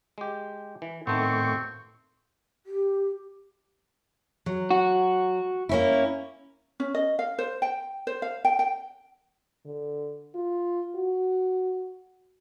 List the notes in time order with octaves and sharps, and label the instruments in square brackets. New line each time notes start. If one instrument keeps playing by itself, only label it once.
[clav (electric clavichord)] G#3 G4
E3
[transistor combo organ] A2 C#6 [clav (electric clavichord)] D#3 A3 B3 [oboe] C4
[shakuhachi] G4
[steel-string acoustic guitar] F#3
[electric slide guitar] F#4
[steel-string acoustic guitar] A#3 C#4 E4
[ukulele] C#4
D#5
F5
C5
G5
C5
F5
G5
G5
[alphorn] D3
F4
F#4